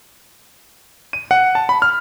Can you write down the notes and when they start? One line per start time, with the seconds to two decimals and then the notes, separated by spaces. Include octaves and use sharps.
1.13 D#7
1.31 F#5
1.55 A5
1.69 B5
1.82 F6